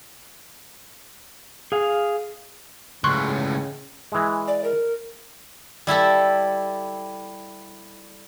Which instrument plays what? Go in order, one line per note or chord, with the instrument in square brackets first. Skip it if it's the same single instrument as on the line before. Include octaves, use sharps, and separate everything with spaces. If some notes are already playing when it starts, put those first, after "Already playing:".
[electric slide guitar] G#4 F5
[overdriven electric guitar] C#2 A2 [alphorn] C#3 [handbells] C6 C#6 F#6
[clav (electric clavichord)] E3 G#3
[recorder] D5
A#4
[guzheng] G3 E4 G4 A4